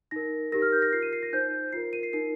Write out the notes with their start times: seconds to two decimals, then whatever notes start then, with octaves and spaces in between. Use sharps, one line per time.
0.11 D#4 A#4 A#6
0.52 D#4 G4 A#4 A#6
0.62 F6
0.72 G6
0.82 A#6
0.92 F4 A#4 C7
1.02 D#7
1.13 C7
1.23 A#6
1.33 D#4 C5 G6
1.73 F4 A#4 C7
1.93 D#7
2.03 C7
2.13 D#4 A#4 C7